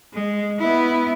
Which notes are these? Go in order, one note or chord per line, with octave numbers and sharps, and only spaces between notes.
G#3
B3 E4